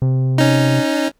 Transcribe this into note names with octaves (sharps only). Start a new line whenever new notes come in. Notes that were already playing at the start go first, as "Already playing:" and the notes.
C3
C#4 D#4